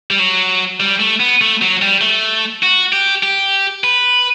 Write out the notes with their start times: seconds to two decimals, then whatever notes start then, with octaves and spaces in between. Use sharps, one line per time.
0.11 G3
0.19 F#3
0.80 G3
1.00 A3
1.20 B3
1.41 A3
1.61 F#3
1.82 G3
2.01 A3
2.63 F#4
2.93 G4
3.23 G4
3.84 B4